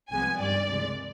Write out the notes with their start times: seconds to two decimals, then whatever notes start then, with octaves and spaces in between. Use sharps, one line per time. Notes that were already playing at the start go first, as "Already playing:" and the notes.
0.10 C2 C3 F3 G#3 B3 G#5
0.39 G2 D#3 G3 D5
0.68 C#2 C3 E3 G#3